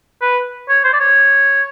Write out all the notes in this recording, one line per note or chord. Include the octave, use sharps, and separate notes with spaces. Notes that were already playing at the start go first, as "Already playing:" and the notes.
B4
C#5
C5
D5
C#5